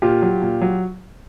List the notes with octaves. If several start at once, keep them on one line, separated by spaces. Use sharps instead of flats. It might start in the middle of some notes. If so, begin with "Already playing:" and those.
A#2 F4 G4
F#3
A#2
F#3